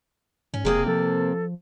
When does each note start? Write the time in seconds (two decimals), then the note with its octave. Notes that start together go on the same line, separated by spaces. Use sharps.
0.54 G#2 C#4
0.65 E1 C3 A#3 C4 G#4
0.86 F3 A4